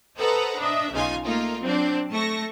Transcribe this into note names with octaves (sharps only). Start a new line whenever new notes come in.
A4 B4 C5 D#5 F#5 A#5
D4 D#5 E5
B1 C#3 D#4 F4 G#5
A3 A#3 D#4 F4
F#3 C4 D4
A3 A5 C#6 A#6